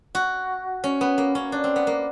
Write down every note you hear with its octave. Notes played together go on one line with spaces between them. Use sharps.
F#4
C#4
B3
A#3
C#4
D4
C4
B3
A#3